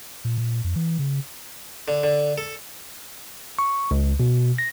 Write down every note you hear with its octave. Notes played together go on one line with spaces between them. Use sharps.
A#2
A#2
F2
E3
C#3
D3
D3
A4
C#6
C#2
B2
A#6